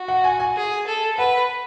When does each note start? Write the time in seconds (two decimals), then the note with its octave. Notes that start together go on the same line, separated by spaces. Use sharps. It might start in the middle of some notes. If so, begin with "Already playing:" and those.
Already playing: F#4
0.08 F#5
0.24 G#5
0.40 G#5
0.56 G#4
0.87 A4
1.18 B4 F#5